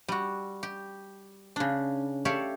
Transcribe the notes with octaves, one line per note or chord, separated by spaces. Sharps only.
G3 F#4
G4
C#3 D4
G4 A4 C#5 D5 E5 F5